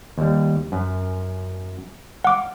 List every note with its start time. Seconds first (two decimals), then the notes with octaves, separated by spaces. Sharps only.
0.18 D#2 G3
0.72 F#2
2.24 F5 F#5 D6